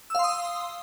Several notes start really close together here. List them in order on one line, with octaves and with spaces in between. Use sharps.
E6 F5 C6 D#6